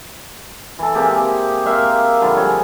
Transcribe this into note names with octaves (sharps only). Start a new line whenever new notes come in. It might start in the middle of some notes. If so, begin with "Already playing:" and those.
E3 A4
A#3 C4 G4 G#4
A#4 E5 F5 C6
D3 F3 G3
G#4 C#5